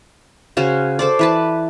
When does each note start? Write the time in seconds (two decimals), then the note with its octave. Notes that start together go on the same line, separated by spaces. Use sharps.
0.57 C#3 C#4 F#4 C5
0.99 A4 C5 D5
1.19 E3 B4 A5